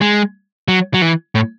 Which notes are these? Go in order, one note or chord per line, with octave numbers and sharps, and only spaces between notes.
G#3
F#3
F#3
E3
A2